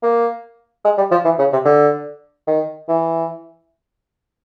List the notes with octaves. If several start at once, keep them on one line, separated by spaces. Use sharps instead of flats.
A#3
G#3
G3
F3
E3
C#3
C3
D3
D#3
E3